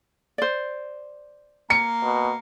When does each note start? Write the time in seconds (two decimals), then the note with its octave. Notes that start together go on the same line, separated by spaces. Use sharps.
0.38 C5 D5
1.70 A#3 C#7
2.02 B2